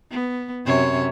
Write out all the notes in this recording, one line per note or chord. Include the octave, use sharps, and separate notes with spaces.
B3
F#2 C3 C#5